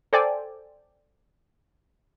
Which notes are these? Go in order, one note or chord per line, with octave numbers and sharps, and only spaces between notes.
A4 C5 D5 G5 G#5